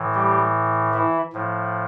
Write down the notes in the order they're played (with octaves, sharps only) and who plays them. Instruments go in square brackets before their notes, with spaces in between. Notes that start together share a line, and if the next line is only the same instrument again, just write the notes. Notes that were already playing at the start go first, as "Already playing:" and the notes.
Already playing: [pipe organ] A2 E3
G3 G4
E3 E4
A2 F3